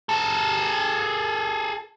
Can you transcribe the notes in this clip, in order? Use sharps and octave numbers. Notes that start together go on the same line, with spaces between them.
G#4 A4